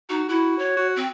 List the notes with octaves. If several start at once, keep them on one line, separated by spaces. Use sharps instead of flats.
D#4 F#4
E4 F#4
C#5
F#4
C4